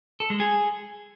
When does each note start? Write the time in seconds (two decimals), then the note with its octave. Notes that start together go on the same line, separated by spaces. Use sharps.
0.20 A4
0.30 G#3
0.40 G#4